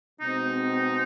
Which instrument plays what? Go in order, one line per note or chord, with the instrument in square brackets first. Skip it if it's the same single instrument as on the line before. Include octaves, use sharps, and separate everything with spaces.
[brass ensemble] B2 G#3 C4 [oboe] D#4